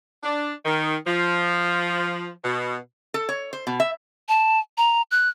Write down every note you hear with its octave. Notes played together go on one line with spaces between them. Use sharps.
D4
D#3
F3
B2
A4
C#5
C5
B2
E5
A5
A#5
F#6